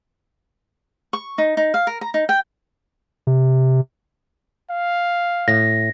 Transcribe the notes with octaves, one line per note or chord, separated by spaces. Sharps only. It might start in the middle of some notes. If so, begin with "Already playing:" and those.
C#6
D#4
D#4
F5
A#4
A#5
D#4
G5
C3
F5
A2 A#6